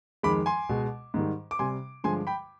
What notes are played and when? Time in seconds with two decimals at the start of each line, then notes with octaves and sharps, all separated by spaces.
0.23 F2 D#3 G#3 B5 D6
0.46 G#5 C6
0.69 B2 G#3
1.14 G#2 D#3 G3
1.51 D6
1.59 C3 G3 G#5 C6
2.04 G2 D3 F3 G#3 G#5 C6
2.27 G5 B5